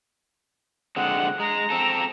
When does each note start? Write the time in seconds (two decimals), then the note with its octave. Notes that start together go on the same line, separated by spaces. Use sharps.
0.96 D3 G#3 C4 F#5
1.40 G#3 A#5
1.70 C4 A4